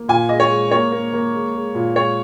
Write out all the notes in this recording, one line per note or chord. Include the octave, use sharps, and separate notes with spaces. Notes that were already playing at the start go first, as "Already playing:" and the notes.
Already playing: A#3
A#2 G#5
G#3 D#5
C#5
G#3
A#3 C#5
A#3
A#3
G#3
G#3
A#2
G#3 C#5